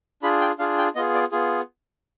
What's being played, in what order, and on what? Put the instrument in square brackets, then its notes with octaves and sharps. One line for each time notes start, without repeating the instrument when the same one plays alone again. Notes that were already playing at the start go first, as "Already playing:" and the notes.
[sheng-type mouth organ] D4 F4 G#4 B5
G5
D4 F4 G#4 F5
G5
B3 F4 G#4 D#5
D5
B3 F4 G#4